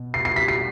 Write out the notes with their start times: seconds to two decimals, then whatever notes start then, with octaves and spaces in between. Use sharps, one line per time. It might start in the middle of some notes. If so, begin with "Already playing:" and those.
Already playing: B2
0.14 C7
0.25 C7
0.36 B6
0.48 C7